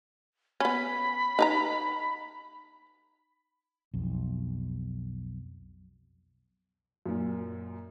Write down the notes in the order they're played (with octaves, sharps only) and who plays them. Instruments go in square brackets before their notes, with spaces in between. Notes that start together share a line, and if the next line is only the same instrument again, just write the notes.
[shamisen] B3 C#4 [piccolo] B5
[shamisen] D#4 B4 A#5
[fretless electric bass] B1 F2
[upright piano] F#2 A#2